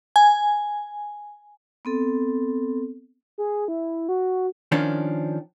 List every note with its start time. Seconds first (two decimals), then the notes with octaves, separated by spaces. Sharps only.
0.16 G#5
1.85 B3 C4 A4
3.38 G#4
3.68 E4
4.09 F#4
4.72 D#3 F3 C#4 D4